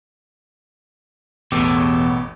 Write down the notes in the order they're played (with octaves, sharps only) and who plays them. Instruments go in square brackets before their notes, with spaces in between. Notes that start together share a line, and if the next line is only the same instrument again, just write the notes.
[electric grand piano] A1 [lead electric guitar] E2 [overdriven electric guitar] B2 [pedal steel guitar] G4 A4 C#5